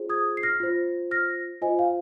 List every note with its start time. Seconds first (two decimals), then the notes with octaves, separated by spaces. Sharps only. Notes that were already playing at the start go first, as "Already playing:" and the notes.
Already playing: F4 G#4 C5
0.09 D#6 G#6
0.37 C7
0.43 F6 A#6
0.60 F4 C5
1.11 F6 A#6
1.62 F4 C5 D#5 G#5
1.79 F5